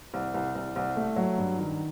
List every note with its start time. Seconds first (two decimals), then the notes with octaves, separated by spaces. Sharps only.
0.14 C2
0.34 C2
0.55 C2
0.76 C2
0.96 A3
1.16 F#3
1.38 G2
1.58 D#3